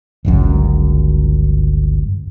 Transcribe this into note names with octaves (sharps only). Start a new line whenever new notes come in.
G1 C#2 F#2